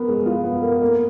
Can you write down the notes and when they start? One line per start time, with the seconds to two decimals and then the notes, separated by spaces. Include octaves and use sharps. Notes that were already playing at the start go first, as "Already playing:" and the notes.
Already playing: B3 A#4
0.08 G#3
0.26 F4
0.44 B3
0.63 A#4
0.82 A#3